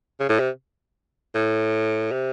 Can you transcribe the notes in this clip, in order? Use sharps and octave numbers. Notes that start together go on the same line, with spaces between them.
C#3
A2
C3
A2
C3